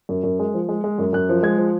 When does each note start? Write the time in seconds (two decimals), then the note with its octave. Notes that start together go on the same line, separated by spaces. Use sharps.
0.09 F#2
0.23 F#2
0.39 G#3
0.54 F3
0.69 G#3
0.84 G#3
0.98 F#2
1.13 F#2 F#6
1.29 F3
1.43 G#3 G#6
1.58 F3